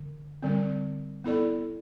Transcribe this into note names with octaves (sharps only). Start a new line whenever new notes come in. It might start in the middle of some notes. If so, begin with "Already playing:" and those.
Already playing: D3
D3 G3 C4
B3 E4 A4 D5